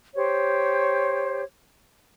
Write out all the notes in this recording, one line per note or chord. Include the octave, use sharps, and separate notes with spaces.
G4 C5 C#5